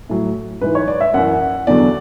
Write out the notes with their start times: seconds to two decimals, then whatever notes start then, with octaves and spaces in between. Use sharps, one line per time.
0.09 A2 F#3
0.61 G#2 E3 B4
0.75 C#5
0.88 D5
1.01 E5
1.14 F#2 E3 F#5
1.67 E2 D3 F#3 D5